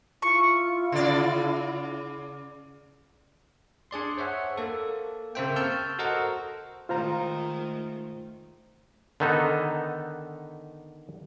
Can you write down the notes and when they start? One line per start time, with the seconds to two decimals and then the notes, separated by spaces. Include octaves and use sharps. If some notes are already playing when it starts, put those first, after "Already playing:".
0.22 E4 F4 C#6
0.92 C#3 D5
3.91 D4 G#4 D5 C6
4.17 C5 C#5 E5 F#5
4.57 A#3 A4
5.35 C#3 A#3 C4 C5 E5 G5
5.56 A5 C#6 E6 F6 G6
5.99 F#4 A4 A#4 C5 D#5 F#5
6.89 D#3 G#3 A3 F4 C5 A#5
9.20 D3 D#3 B3 D#4 A4